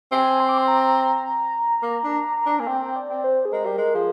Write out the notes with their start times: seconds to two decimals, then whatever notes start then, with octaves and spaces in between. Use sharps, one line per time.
0.12 C4 G#5
0.40 C6
0.49 D6
0.58 C6
0.68 A#5
1.83 A#3
2.04 D4
2.46 D4
2.60 A#3 G#5
2.67 C4 G5
2.96 D5
3.09 C4
3.24 C5
3.45 G#4
3.52 G#3 A#4
3.65 G3
3.78 G#3
3.94 F3 G#4